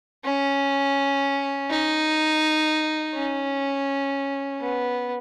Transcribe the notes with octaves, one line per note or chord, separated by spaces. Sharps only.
C#4
D#4
C#4
B3